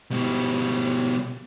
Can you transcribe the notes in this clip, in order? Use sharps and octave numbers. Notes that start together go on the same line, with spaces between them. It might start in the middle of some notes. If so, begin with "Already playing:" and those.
B2 G3